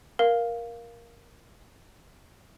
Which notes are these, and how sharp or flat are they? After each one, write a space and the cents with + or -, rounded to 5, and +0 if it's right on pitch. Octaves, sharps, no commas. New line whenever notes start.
A#4 +10 F5 +0